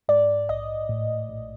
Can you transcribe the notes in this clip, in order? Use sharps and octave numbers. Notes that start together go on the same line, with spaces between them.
G#2 D5
A#1 D#5
A2
A#1